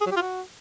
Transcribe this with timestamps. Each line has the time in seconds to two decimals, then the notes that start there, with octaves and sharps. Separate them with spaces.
0.01 G#4
0.06 F#3
0.11 G4
0.16 F4
0.22 F#4